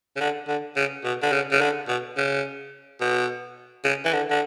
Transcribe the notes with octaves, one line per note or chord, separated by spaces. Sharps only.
C#3
D3
D3
C#3
B2
D3
C#3
C#3
D3
B2
C#3
B2
C#3
E3
D3
D3